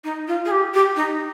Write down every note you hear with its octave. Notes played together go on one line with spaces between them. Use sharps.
D#4
F4
G#4
G4
G4
D#4